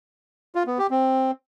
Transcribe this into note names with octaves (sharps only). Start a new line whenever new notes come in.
F4
B3
G4
C4